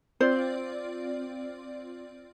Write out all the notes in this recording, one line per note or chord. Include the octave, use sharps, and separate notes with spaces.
C4 F4 C5 D5